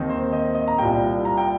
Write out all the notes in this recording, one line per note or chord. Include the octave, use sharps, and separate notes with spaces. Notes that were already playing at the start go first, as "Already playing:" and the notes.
Already playing: D#2 D#3 C4 D#4
C5
D#5
D#5
A#5
C2 A#2 G3 A#3 G5
A#5
G5